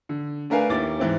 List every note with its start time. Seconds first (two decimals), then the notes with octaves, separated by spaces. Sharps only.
0.09 D3
0.50 A3 D4 A#4 B4 F5 G#5
0.70 D#2 E4 D6 A6
1.00 G#2 E3 C4